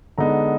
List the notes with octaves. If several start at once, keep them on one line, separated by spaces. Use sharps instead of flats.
D3 G#3 B3 D#4 A#5